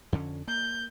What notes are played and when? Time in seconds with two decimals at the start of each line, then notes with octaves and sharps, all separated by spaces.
0.12 F2 D3 C#4
0.48 A#3 G6